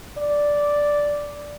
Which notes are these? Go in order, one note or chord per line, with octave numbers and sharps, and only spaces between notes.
D5